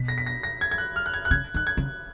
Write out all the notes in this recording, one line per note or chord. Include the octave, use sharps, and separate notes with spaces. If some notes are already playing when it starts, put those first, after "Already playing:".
Already playing: B2 B6
A#6
B6
A#6
A#6
G#6
G#6
F#6
F6
F#6
G#6
F#6
C#3 G#6
D#3 F#6
G#6
C#3